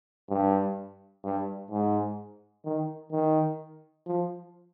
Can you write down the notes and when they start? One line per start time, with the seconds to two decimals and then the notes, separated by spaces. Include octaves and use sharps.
0.30 G2
1.24 G2
1.71 G#2
2.65 D#3
3.12 D#3
4.06 F3